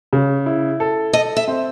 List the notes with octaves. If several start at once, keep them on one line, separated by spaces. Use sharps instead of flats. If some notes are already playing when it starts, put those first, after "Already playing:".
C#3
E4
A4
A4 D#5
E5
C4